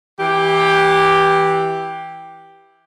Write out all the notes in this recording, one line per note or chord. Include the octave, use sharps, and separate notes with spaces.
E3 G4